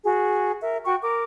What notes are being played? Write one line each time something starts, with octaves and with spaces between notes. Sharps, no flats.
F#4 G#4
A#4 E5
F#4 G5 C#6
A#4 D6